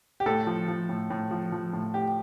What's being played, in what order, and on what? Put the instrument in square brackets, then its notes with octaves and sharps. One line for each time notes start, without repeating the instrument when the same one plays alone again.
[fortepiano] G4
A2 A4
F3
F3
A2
A2
F3
F3
A2
A2 G4